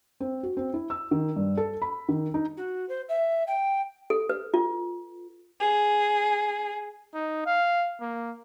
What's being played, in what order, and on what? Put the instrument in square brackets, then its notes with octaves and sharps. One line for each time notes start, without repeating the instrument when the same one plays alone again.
[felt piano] C4
F#4
C4
E4
E6
D#3
G2
A4
B5
D#3
D#4
[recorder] F#4
C5
E5
G5
[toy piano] A4
B4
F4
[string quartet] G#4
[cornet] D#4
F5
A#3